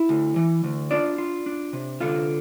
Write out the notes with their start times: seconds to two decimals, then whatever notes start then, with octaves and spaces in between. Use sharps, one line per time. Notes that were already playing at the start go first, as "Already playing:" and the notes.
Already playing: E4
0.09 D2
0.36 E3
0.64 D2
0.91 D4 F4 D5
1.18 F4
1.46 D4
1.73 C3
2.01 D3 F4 F5